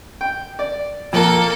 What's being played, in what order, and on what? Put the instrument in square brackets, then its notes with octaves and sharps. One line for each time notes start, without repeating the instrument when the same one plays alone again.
[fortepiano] G5
D5
[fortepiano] F2 [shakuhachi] A#3 [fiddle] A4